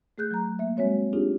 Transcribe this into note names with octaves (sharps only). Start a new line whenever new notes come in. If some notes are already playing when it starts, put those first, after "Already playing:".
A3 G#4 F#6 G6
F#3 A#5
A#3 E5
G3 G#3 C4 F#4 C#5 E5
C4 D4 D#4 F4 G4 G#4